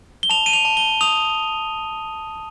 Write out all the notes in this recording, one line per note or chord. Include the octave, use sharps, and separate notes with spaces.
G7
A5 F7
D#7
F7
A5
G7
D#6 F7